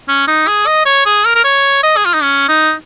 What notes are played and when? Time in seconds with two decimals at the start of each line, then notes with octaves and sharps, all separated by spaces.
0.08 C#4
0.27 D#4
0.47 G#4
0.67 D#5
0.86 C#5
1.06 G#4
1.25 A#4
1.35 A#4
1.44 C#5
1.83 D#5
1.97 G#4
2.05 F4
2.14 D#4
2.22 C#4
2.49 D#4